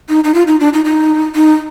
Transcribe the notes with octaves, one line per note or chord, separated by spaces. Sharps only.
D#4
D#4
F4
D#4
D4
D#4
D#4
D#4